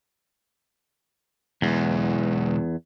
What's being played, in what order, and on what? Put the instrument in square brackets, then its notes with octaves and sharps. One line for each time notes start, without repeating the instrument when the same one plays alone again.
[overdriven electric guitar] B1 G#3 [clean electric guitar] E2